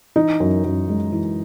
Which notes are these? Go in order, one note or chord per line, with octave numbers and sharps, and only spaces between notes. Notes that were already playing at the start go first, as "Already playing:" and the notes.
E3 D#4
F#2
F#2
G#3
E3